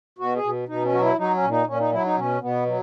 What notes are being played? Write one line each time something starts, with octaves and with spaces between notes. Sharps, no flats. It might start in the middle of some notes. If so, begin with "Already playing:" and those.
B2 F#4
G#4
B2
B2 D#4
C#4
F#3 F#4
E4
F#3 D#4
C#4
A#2
D#4
A#2 C#4
D#4
F#3 E4
D#4
B2 C#4
B2 B3
F#3